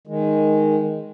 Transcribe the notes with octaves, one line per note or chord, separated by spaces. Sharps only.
D#3 G#3